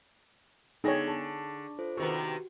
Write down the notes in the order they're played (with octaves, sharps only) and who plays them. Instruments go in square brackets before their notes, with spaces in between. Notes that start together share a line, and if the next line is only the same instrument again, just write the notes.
[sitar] D3 [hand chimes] B3 G#5 [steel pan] D#4 C#5 [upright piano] G#4 G5 A#6
[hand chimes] G#4 C#6 [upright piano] A5
[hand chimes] F4 A4 C5
[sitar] C3 D#3 B3 [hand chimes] F#4 G4 [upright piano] C#6